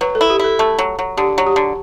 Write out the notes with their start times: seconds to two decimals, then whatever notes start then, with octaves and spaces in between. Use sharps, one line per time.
0.01 F#3 B4
0.15 A4
0.21 E4
0.30 G4
0.39 E4 A4
0.59 A3 A4
0.79 F#3
0.99 F#3
1.17 D3 G4
1.38 F#3
1.47 G4
1.56 D3